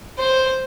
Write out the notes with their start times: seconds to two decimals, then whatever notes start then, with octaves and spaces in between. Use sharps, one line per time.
0.19 C5